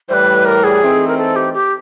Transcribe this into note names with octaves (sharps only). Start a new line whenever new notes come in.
A2 E3 G3 B4 C5
A#4
G#4
E3 A3 C4 D#4
A#4
A4
G4
G4